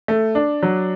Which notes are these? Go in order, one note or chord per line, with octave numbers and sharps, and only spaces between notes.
A3
D4
F#3